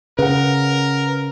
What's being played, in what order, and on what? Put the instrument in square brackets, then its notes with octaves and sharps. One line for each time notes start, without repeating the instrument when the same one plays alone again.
[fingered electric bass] C#3 [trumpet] A#4 [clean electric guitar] B4 F#5